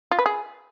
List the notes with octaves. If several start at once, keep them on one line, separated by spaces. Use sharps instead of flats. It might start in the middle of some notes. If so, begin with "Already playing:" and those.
F4
B4
G#4